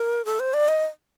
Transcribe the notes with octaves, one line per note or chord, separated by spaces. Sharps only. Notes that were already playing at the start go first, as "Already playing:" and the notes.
Already playing: A#4
A4
C5
D5
D#5